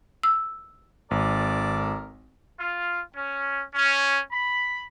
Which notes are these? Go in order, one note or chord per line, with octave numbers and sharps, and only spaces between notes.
E6
G#1 A4 A#4 D5
F4
C#4
C#4
B5